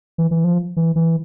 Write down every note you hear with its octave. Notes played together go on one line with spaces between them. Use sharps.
E3
E3
F3
E3
E3